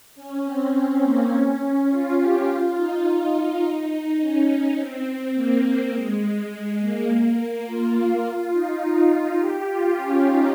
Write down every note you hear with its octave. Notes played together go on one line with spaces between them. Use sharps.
C#4
C4
C4
A#3
C#4
F4
G4
F4
D#4
D#4
C#4
C4
A#3
G#3
G#3
A#3
A#3
F4
F4
D#4
F4
G4
F4
C#4
D#4